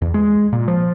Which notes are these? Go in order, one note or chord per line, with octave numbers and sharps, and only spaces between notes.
E2
G#3
A#2
F3